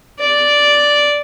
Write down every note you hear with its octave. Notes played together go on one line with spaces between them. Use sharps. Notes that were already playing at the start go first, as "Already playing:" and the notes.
D5